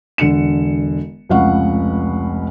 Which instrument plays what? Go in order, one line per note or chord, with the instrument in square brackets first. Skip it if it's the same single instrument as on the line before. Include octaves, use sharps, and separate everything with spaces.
[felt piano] E1 D3 C#7 E7
F1 C#2 F5 F#5 C#6